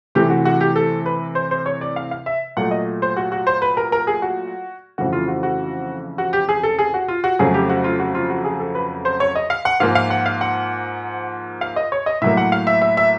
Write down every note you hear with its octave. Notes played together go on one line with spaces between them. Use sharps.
C3 E3 A3 G4
F#4
F#4
G4
A4
B4
C5
C5
C#5
D5
F5
F5
E5
A#2 F#3 A3 F#5
D#5
C5
F#4
F#4
C5
B4
A#4
A#4
G#4
F#4
F2 C#3 E3 A3 F#4
F4
F#4
F#4
F#4
G4
G#4
A4
G#4
F#4
F4
F#4
F2 C#3 F#3 A3 G#4
G4
F#4
F4
F#4
F4
F#4
G#4
A4
B4
C5
C#5
D#5
F5
F#5
G#2 F3 A#3 F5
F5
F#5
F5
F#5
F5
D#5
C#5
D#5
A2 F#3 A#3 E5
F#5
F5
E5
E5
E5